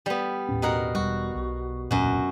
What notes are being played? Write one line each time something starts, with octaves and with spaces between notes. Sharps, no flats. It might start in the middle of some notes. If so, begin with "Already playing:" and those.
G3 B3
D#2 A2 C#4
B2 A#4 F#5
E1 G3 F#4
B1
E1 C#2 F#2 A#2 F#4